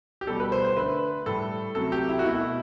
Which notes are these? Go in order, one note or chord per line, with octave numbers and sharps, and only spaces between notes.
G4
B2 G3 A4
B4
C5
C5
D3 A3 B4
A2 G3 A4
C3 F#3 A3 A4
G4
E4
F#4
B2 A3 E4